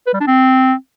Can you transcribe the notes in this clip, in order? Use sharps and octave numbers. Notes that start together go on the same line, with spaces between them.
B4
G3
D4
C4